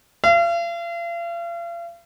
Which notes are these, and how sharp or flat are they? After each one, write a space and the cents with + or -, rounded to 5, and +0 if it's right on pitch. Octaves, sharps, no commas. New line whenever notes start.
F5 -40